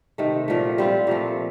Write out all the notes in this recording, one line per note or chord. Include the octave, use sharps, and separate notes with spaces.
C3 D#3 A3
A#2 F3 A3
G3 C4 F4
A#2 F3 A3